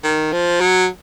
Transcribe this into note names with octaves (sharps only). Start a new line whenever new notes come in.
D#3
F3
F#3